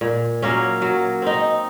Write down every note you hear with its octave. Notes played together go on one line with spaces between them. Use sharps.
A#2
F#3 A#3 C#4
F#3
C4 D#4